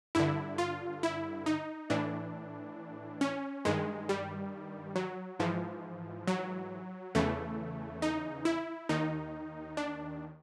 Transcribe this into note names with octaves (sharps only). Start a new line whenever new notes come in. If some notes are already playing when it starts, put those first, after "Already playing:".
G2 D3 E4
F4
E4
D#4
A2 E3 D4
C#4
G2 D#3 G#3
G3
F#3
G#2 E3 F3
F#3
E2 C#3 E3 A3
D#4
E4
D#2 D#3 D#4
D4